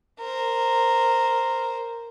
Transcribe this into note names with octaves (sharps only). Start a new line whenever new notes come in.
A#4 C5